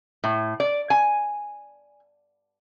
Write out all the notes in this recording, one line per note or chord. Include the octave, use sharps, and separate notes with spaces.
A2
D5
G#5